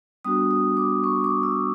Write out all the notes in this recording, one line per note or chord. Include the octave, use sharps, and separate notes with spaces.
G3 B3 D4 F#4 D#6
D#6
D6
C#6
D6
E6